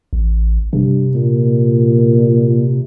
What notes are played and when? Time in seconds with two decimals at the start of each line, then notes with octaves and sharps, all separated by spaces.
0.13 A1
0.73 G2 C3
1.15 A#2